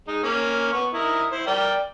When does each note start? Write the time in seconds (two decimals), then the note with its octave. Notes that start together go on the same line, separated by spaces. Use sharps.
0.08 G#3 D#4
0.23 A#3 C#4
0.73 B3 C#6
0.93 E4 A#4 D#5
1.31 E4 C5
1.47 A#4 D5 G5